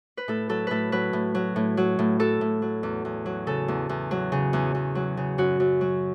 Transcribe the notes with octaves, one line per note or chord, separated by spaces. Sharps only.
B4
A2 A4
F#3 A4
A2 A4 B4
F#3 B4
A2
F#3
A2
F#3
A2
F#3 A4
A2
F#3
E2
E2
F#3
C#3 A4
E2
E2
F#3
C#3
E2
E2
F#3
C#3
F#2 F#4
F#2
F#3